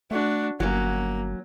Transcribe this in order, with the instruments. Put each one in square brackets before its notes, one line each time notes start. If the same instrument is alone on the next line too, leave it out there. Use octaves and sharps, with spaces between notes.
[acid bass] A3 [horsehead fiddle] D4 F#4
[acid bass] G1 [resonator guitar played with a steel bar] F#3 C#4 [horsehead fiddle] A#3